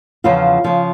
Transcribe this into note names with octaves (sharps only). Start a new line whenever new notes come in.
E2 C#3 F3 F4
C#3 F3